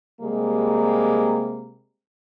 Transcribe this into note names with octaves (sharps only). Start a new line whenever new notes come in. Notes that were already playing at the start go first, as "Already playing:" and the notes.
C3 G3 G#3 A#3